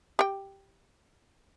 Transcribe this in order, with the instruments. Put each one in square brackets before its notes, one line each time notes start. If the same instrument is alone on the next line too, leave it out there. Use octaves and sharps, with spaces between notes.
[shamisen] G4 G5